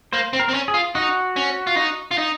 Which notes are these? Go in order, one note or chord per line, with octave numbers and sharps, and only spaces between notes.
A#3 C5
C4
A#4
C4
C#4
G#4
F4
D#4 F#4
C#4
F4
D#4
F4
D#4